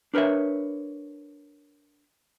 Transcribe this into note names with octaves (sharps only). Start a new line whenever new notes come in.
D4 A#4 B4 C#5 E5